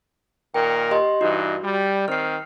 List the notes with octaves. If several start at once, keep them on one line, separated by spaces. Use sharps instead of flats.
A#2 D#3 A#4 G5
G4 D#5 C6
G2 E3 D#4 F#4
G3
D#3 C4 F6 C7